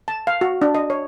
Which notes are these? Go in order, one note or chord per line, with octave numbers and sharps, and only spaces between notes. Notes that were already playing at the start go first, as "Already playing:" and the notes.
A5
F5
F#4
D4
D#5
C#5